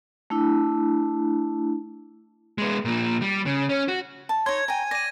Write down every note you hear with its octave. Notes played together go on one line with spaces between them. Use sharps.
A3 D4 E4
G#3 B3
A#2 F3
G3
C#3
C#4
F#4
A5
D#4 C#5 C6 G#6
G5 G#5 A#5
D5 A#6 D#7